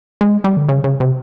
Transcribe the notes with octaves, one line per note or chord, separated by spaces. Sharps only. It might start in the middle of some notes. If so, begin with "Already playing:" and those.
G#3
G3
D3
C#3
C#3
C3